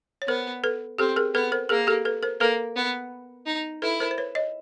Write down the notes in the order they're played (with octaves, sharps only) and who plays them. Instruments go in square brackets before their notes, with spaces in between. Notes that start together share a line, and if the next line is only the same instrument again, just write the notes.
[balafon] C#5
[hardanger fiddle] B3 [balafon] A#4 C5
[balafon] A4 B4
[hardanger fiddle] C4 [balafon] G4 A4
[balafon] G#4 A#4
[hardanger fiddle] B3 [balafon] A4 B4
[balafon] A#4 C5
[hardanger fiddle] A#3 [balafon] G#4 A#4
[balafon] G4 A4
A4 B4
A#4 C5
[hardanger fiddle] A#3 [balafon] A4 B4
[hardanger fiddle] B3
D#4
[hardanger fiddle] E4 [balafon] A4 B4
[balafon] A#4 C5
C5
B4 C#5
C#5 D#5